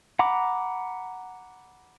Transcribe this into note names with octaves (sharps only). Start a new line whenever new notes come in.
F#5 A#5 B5 D6